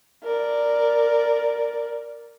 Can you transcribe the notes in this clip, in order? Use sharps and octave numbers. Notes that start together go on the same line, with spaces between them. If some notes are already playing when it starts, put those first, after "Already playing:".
A#4 D5